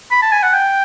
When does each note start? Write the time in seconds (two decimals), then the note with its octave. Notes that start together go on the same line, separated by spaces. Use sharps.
0.11 B5
0.22 A5
0.32 G#5
0.43 F#5
0.54 G5